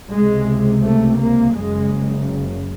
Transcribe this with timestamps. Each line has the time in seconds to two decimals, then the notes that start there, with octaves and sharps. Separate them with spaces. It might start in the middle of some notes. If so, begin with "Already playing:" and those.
0.14 C#2 C3 G#3
0.84 A3
1.20 A#3
1.55 F#1 F#2 C#3 G#3